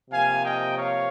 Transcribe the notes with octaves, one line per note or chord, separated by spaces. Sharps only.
C3 F3 A#3 F5 G#5
D#5 G5
C#5 F5